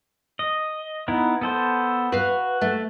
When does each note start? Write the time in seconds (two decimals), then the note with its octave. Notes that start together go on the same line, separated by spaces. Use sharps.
0.39 D#5
1.08 B3 D#4 E4
1.41 B3 A4 C5
2.12 F#4 B4 F5
2.61 A3